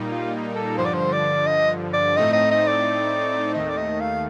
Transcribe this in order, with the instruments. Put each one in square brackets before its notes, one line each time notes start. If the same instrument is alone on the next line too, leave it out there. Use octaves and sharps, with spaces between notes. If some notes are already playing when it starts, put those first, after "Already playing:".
Already playing: [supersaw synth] A#2 G3 A#3 D#4
[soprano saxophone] F4
A4
[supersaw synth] G2 D3 F3 [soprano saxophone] C5
[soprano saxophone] D5
C5
D5
D#5
D5
[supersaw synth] A2 A3 C4 D#4 [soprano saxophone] D#5
[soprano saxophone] D#5
D#5
D5
[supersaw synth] D#2 D#3 A3 [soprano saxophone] D#5
[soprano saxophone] D5
D#5
F5